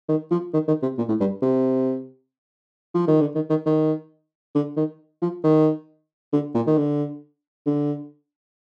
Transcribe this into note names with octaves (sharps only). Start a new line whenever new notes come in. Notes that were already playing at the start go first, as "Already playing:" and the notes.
D#3
F3
D#3
D#3
C3
A#2
A2
G2
C3
F3
D#3
D3
D#3
D#3
D#3
D3
D#3
F3
D#3
D3
A#2
D#3
D3
D3